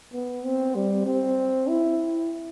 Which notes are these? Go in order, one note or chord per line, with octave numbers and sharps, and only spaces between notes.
B3
C4
G3
C4
E4